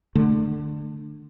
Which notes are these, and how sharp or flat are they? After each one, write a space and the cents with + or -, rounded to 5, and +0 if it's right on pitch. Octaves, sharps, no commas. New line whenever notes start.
D3 +20 A3 +0